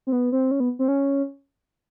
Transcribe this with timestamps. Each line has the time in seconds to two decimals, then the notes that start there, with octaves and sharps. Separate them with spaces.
0.07 C4
0.12 B3
0.32 C4
0.51 C#4
0.60 B3
0.79 C4
0.88 C#4